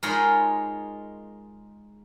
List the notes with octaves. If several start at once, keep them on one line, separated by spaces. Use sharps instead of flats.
G#3 D#4 F4 A#4 C#5 B5